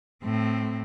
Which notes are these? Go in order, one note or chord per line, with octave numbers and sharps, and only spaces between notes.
A2 C4